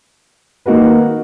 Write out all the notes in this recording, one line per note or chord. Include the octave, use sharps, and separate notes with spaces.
D#3 A#3 D#4 F#4 B4